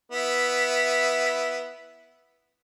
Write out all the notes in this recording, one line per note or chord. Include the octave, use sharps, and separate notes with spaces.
B3 E4 E5